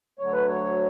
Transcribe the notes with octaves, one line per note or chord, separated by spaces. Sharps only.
D2 D3 F#3 C#5
B4
C#5